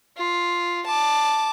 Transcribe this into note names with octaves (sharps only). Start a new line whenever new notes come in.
F4
A5 D6